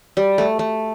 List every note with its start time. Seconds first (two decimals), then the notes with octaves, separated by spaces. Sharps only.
0.17 G3
0.38 A3
0.59 A3